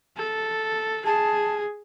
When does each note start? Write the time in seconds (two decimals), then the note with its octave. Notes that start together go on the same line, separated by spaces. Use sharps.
0.17 A4
1.06 G#4 A5